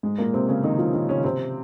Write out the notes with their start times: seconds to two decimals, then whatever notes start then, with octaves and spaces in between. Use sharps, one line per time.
0.03 G#2 G#3
0.18 A#2 A#3
0.34 C3 C4
0.48 C#3 C#4
0.64 D#3 D#4
0.78 F3 F4
0.94 D#3 D#4
1.09 C#3 C#4
1.24 C3 C4